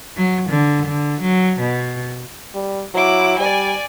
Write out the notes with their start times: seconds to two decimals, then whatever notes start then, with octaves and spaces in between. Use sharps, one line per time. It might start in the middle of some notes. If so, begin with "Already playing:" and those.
0.17 F#3
0.50 D3
0.86 D3
1.21 F#3
1.60 B2
2.55 G3
2.94 F#3 E4 D6
3.39 G3 D5 G#5